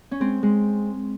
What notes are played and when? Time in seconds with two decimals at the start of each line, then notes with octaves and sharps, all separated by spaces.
0.11 C#4
0.20 G#3 C4
0.43 G#3